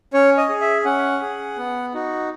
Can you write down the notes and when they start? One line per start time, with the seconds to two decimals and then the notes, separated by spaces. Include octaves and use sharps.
0.13 C#4 C#5
0.37 D#5
0.49 G#4
0.61 E5
0.85 C#4 F#5
1.21 G#4
1.57 B3
1.94 D#4 F#4